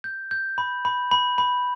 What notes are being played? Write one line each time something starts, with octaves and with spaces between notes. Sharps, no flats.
G6
G6
B5
B5
B5
B5